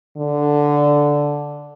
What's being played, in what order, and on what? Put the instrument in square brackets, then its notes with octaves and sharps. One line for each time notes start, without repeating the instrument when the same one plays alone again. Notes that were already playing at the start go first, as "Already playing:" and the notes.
[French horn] D3